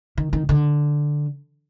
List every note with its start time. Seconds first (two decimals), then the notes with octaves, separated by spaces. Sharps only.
0.18 D#3
0.33 D#3
0.49 D3